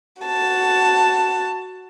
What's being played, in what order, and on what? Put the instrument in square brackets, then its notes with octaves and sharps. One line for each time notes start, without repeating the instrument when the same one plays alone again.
[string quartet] F#4 A5